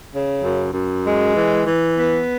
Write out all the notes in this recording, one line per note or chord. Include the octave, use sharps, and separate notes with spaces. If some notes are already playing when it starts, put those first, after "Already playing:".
C#3
F#2
F#2
G#3
E3
E3
B3